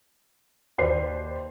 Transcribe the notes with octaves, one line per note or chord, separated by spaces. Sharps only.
D#2 B4 C5 D5 C7